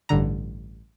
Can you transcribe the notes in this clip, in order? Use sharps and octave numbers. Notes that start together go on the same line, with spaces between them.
A1 G2 D3 A#5